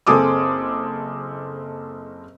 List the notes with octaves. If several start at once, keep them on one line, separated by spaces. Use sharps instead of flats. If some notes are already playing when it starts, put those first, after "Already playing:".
F#1 C4 G#4 A4 D6 D#6